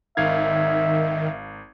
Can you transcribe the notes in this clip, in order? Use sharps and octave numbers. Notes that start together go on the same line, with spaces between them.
G#1 D#3 E5 F5 G#6